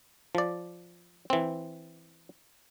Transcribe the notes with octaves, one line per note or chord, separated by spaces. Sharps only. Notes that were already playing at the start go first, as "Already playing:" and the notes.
F3 D5
E3 C4